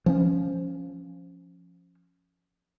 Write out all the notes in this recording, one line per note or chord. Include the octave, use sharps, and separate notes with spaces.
F3 C4 C#4